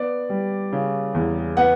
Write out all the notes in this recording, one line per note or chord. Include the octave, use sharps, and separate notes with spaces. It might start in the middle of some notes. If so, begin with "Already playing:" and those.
Already playing: B3 D5
G3
C#3
E2
B3 F#5